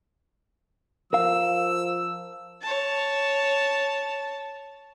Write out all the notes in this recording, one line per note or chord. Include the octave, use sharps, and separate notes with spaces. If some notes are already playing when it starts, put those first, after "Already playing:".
F3 A#4 F5 E6
C#5 A5